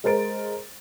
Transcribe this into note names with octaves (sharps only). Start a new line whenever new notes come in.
G#3 A#4 C5 A6 D7